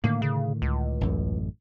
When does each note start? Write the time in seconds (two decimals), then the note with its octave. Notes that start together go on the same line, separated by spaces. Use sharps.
0.04 A2 D3 D#3 A#3
0.22 C#3
0.62 C#2
1.01 A1 F#2 A2